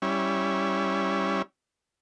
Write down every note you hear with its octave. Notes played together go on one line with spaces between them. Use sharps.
G3 C#4 E4